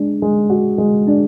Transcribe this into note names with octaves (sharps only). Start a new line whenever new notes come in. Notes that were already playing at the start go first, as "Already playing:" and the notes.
Already playing: G#3 D4
G#3
F#4
G#3
D4